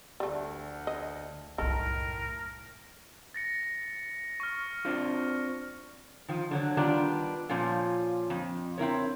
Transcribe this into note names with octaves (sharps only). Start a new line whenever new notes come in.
D2 G3 A3
D#5
C2 F#2 A2 D#3 A4 A#4
A6 A#6 C#7
C#6 F6
C4 D4 F4
D#3 F3
D3 F#3 C#5
D#3 G3 B3 D4 F4
A#2 F3 C#4 F4
F2
C4 E4 A#4 C#5